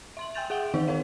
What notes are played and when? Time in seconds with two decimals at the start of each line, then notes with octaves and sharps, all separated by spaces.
0.17 E5 C6 F#7
0.35 G5 G#5 C6 G6 A6 F7
0.50 G#4 E5 F#5 G5 D7 G7
0.74 D#3 E3 D#4
0.88 D#4 A#4 C#5 F5